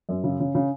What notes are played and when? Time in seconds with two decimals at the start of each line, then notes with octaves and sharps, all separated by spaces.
0.09 F#2
0.24 C#3
0.40 C#3
0.55 C#3